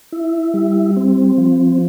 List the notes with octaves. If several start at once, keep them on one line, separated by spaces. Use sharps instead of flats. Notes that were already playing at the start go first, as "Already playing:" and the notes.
E4
G3
C4
F3